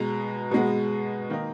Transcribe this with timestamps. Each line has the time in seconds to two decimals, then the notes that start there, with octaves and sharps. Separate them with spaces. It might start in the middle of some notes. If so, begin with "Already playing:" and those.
Already playing: B2 G#3 B3 A#5
0.51 B2 G#3 B3
1.30 D#3 A#3 D#4